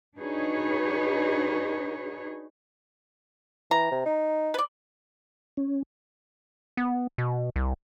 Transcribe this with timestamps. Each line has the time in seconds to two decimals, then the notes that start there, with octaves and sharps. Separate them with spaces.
0.16 D4 D#4 F#4 G#4 B4 C#5
3.71 E3 A#5
3.92 C3
4.06 D#4
4.54 B4 D5
5.57 C#4
6.77 B3
7.18 B2
7.56 C2